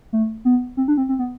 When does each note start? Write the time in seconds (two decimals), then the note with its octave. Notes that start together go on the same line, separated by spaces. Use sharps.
0.13 A3
0.45 B3
0.77 C4
0.88 D4
0.97 C4
1.09 C4
1.19 B3